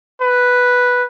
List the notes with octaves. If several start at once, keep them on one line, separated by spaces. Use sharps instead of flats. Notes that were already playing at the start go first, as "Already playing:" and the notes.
B4